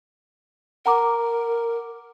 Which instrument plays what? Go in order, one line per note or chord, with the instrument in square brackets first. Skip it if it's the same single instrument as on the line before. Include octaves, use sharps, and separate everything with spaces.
[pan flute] A#4 [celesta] F#5 A#5 D6